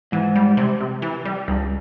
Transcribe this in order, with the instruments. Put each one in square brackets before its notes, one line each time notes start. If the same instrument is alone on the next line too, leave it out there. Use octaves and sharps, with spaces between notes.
[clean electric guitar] G#2 [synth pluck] E3
[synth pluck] G3
C3
C3
E3
G3
[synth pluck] C#2 [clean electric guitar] G2